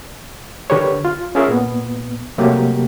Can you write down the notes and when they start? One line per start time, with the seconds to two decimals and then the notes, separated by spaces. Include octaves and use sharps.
0.70 D3 D4 G4 A#4 B4 C#5
1.05 F4
1.35 C#4 F4 G#4 A#4 E5
1.48 A#2 B3
2.38 C3 F#3 A3 A#3 G4